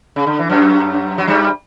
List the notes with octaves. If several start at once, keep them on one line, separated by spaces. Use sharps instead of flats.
C#3
D3
E3
F#2 F#3
F#3
G2 G3